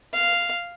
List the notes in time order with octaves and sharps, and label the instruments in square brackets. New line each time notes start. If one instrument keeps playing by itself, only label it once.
[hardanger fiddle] F5